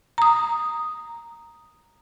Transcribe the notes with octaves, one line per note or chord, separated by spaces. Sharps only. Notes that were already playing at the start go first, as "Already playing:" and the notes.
A#5 D#6